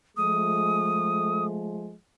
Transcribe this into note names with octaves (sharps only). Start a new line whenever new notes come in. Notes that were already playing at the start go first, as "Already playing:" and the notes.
F3 G#3 A3 D#6